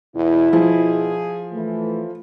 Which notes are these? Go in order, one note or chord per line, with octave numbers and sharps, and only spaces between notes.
E2 B2 E4
F3 G#4
E3 A3